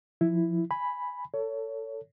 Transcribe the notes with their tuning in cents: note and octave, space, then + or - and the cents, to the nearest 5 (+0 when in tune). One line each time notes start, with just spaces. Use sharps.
F3 +0 E4 +0
G#5 +0 B5 +0
A4 +25 C#5 +20